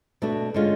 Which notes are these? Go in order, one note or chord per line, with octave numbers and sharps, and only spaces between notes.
B2 A3 D4 F#4
D3 G#3 C#4 F4